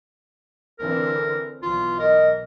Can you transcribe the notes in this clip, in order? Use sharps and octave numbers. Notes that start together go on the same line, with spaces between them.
D3 E3 C4 A#4
B1 E3 F4
A#4 D#5